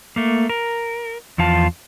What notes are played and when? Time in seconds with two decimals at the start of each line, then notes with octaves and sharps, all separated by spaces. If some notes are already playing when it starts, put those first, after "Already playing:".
0.16 A3 A#3
0.49 A#4
1.38 E2 F3 F4 A5